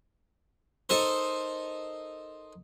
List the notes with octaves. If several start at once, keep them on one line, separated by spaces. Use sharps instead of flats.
D#4 A4 A#4 C5